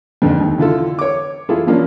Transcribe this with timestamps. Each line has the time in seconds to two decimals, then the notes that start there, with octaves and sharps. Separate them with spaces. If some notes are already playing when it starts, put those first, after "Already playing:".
0.22 F2 G#2 D3 D#3
0.40 D#2
0.58 D3 E4 F4 A4
0.99 C#5 D6
1.49 E4 F4 G#4 A4
1.67 E3 F3 A#3 C#4 D4